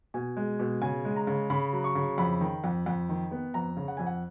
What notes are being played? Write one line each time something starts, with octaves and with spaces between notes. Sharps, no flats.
B2 G#5
G#3
B2
C#3 G#5
G#3
A#5
C#3
C#3 B5
F#3
C#6
C#3
F2 B5
D#3
F2
F2
D#3
B3
F2 A#5
C#3
F#5
F2 G#5
F#5